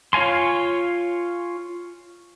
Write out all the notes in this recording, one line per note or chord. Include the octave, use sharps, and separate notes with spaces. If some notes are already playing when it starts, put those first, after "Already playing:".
F4 C#5 F5 G#5 C6